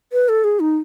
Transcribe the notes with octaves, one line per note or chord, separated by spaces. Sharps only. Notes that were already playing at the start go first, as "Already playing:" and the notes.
B4
A4
G#4
D#4